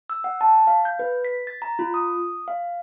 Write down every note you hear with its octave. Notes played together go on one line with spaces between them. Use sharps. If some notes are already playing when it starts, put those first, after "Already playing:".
E6
F#5
A5
F5
G6
B4
B6
A6
A#5
F4
D#6
F5